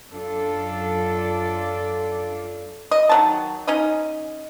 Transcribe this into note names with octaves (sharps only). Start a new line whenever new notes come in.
F#2 D4 F4 A4 D5
D#5
D#3 F#3 A5
C#4 D#4 D#5